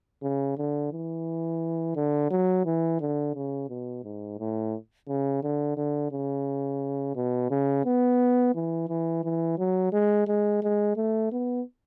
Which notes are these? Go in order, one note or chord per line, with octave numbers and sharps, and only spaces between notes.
C#3
D3
E3
D3
F#3
E3
D3
C#3
B2
G#2
A2
C#3
D3
D3
C#3
B2
C#3
B3
E3
E3
E3
F#3
G#3
G#3
G#3
A3
B3